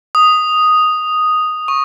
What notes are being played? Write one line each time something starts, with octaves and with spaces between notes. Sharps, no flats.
D#6
C#6